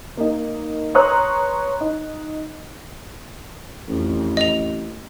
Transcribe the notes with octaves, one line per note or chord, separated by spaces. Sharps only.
A#3 D#4
B4 C#5 A#5 C6 D#6 F#6
D#4
A1 F2
D#5 F7